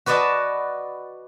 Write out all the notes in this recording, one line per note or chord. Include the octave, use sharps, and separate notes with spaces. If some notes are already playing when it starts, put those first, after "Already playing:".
F#4 B4 D5 D#5 A5